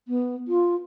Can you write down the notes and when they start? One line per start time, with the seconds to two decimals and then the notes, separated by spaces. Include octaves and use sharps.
0.08 B3
0.48 F4